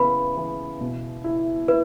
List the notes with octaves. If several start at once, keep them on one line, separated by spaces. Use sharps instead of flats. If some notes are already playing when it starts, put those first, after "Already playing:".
Already playing: C#3 E3 B3 B4 B5
E3
B2
E4
E4 B4